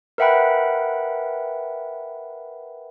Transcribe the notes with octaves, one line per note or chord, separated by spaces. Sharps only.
A#4 B4 E5 F#5 G5 B5